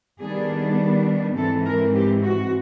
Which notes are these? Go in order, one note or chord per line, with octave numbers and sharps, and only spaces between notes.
D#3 G3 B3 D4 G#4
G#2 E3 G#3 C4 A4
A#4
G4
F#4